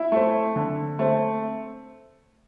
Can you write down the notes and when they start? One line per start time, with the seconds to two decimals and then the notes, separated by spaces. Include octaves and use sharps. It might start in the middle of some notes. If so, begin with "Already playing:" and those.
Already playing: E4 E5
0.12 A3 C4
0.56 D3
0.99 A3 C4